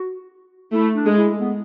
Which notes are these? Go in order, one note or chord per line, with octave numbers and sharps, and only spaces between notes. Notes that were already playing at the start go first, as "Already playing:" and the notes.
Already playing: F#4
A3 E4
D4
G#3
E4
B3